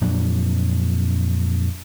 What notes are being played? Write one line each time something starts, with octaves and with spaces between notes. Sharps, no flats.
F2 A#2 F#3 D4